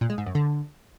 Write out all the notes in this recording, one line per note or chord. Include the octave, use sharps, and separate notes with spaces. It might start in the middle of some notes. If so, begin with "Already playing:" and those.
A#2
G#3
G#2
F#2
D3